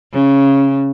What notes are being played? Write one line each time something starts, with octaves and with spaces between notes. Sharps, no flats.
C#3